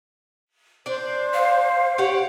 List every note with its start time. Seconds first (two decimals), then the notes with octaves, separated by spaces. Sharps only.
0.86 D4 C5 D5
1.34 F5
1.98 G4 C#5 F#5